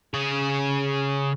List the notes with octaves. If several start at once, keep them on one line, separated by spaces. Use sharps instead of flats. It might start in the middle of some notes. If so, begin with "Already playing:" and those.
C#3 G#4